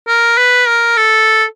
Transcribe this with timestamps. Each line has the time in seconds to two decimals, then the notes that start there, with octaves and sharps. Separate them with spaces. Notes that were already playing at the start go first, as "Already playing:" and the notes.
0.08 A#4
0.38 B4
0.68 A#4
0.97 A4